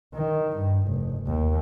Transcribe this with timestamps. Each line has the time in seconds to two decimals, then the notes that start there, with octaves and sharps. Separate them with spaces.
0.15 D#3
0.58 G2
0.88 F1
1.27 D#2